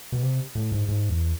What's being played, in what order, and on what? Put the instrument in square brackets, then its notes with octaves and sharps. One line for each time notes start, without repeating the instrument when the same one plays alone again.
[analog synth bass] B2
C3
A2
G#2
G#2
E2